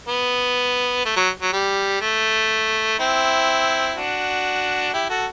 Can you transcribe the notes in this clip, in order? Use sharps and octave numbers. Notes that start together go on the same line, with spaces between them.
B3
A3
F#3
F#3
G3
A3
C4 E4
D4 F#4
E4 G4
F#4 A4